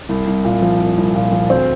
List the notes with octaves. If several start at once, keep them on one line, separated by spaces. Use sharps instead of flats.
C2
C2
A#2
F3
C2
C2
A#2
F3
D2 C4